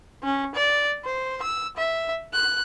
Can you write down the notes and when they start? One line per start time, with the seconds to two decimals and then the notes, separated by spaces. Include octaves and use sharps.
0.23 C#4
0.55 D5
1.05 C5
1.42 E6
1.77 E5
2.33 F#6